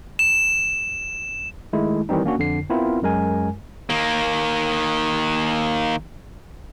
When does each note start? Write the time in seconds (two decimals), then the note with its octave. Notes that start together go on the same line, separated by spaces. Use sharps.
0.19 E7
1.73 D#3 G#3 A3 E4
2.09 D#3 E3 G3 C4 D#4
2.25 A#3 C#4 D4 F#4
2.38 F2 D3 C7
2.70 B3 C4 E4 F4 A#4
3.02 F#2 G#3 A#4 G#5
3.90 D#3 A#3